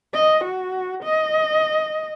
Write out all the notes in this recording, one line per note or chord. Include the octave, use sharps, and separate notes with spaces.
D#5
F#4
D#5